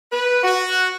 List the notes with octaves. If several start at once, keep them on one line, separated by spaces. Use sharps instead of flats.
B4
F#4